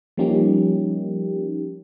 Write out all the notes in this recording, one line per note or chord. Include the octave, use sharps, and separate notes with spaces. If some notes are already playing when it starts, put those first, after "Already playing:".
F3 G3 A#3 C#4 D#4 G4